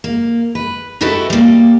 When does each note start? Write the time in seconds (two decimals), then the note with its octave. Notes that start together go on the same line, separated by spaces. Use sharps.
0.04 A#3
0.55 B4
1.01 D#4 E4 F#4 G4 A4 B4
1.30 G3 A#3